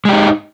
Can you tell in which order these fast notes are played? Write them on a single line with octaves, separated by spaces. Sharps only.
G#3 G4 D#4